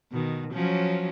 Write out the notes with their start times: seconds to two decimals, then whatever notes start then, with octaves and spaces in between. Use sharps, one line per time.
0.12 B2 D#3
0.53 F3 F#3 C#4